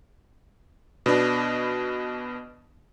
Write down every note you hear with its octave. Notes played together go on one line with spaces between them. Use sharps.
B2 B3 D4